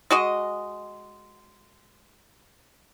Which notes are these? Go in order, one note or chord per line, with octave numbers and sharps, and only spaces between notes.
G#3 F#4 D#5